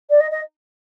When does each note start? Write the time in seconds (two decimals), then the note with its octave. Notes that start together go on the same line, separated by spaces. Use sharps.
0.10 D5
0.20 D#5
0.31 D#5